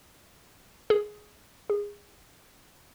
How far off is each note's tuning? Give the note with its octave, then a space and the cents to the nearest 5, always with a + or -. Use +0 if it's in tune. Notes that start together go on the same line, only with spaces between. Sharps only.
G#4 +10
G#4 -20